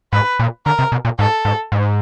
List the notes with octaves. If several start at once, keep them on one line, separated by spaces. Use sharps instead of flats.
G#2 B4
A#2
D3 A#4
C3
B2
A#2
G#2 A4
G#2
G#2